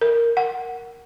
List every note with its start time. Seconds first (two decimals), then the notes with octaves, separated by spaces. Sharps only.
0.01 A#4
0.37 F#5